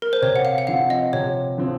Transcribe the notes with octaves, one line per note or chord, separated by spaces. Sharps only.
A#4
C5
C3 C#5
F#5
F5
F#5
F3 C4 F5
D#5
C3 C#5
F3 C4